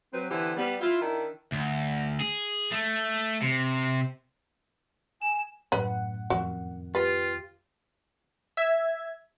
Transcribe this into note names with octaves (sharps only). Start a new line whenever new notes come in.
F#3 C4 B4
D3 E3 B3 G4 B4 C5
G3 B3
E4 F4
D#3 D4 E4
D2
G#4
A3
C3
G#5 E7
F#2 A2 B4 F#5 B5
F2 D#3 F#4
F4 G4 B4
E5 G#6